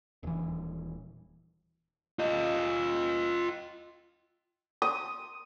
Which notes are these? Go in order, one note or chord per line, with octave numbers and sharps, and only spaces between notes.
D#1 E3
F4 D#5
D#6